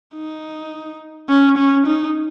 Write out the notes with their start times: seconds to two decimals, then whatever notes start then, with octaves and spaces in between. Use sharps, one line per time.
0.15 D#4
1.29 C#4
1.57 C#4
1.86 D#4